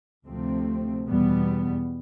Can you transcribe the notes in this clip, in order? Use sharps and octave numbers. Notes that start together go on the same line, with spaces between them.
D2 C3 F3 A3 C4
E2 B2 G3 B3